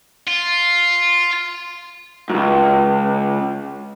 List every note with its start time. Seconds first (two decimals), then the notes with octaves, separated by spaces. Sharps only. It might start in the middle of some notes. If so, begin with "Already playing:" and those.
0.27 F4
2.30 C#2 F#2